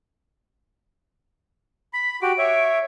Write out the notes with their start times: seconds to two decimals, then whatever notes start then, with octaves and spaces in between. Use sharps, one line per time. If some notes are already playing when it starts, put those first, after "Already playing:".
1.93 B5 B6
2.22 F#4 G4 D7
2.38 C#5 E5